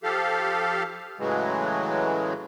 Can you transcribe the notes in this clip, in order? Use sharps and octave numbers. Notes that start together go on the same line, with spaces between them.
F3 G4 A4 F5
A2 C#3 E3 F#3 G#3